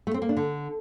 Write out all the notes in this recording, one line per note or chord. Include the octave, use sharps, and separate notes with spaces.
A3
C4
A#3
D4
D3